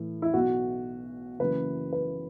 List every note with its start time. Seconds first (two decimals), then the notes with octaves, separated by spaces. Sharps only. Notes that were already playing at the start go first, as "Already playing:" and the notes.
Already playing: A2 E3
0.22 E4
0.34 B1 B2 F#4
1.39 F#1 F#2 E3 B4
1.93 B4